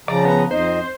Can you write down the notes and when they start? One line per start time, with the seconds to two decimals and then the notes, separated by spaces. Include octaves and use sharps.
0.08 C#3 F3 D5 A#5
0.25 B3
0.51 F2 D#4 C5